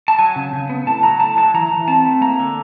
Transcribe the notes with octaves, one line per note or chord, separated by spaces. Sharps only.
A5
F#3 G#5
C#3
C#3
B3
A2 A5
F#3 A#5
A2 A5
F#3 A5
E3 A#5
E3
C4 A5
A3
A#3 A#5
D3